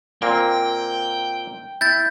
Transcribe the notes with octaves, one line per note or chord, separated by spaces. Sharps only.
A#2 A#3 C4 G5
E4 G6 A6